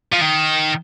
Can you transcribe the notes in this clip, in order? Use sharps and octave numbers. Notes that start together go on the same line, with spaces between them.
F3
D#3